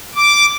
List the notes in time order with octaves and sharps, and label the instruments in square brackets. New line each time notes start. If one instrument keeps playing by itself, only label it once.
[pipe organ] D6